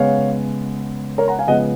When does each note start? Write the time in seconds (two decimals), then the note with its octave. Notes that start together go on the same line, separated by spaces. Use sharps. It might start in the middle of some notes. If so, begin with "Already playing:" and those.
Already playing: C#3 G#3 B3 C#5 F5
1.18 A#4 C#5
1.28 F#5 A#5
1.39 F5 G#5
1.47 C#3 F3 G#3 B3 D#5 F#5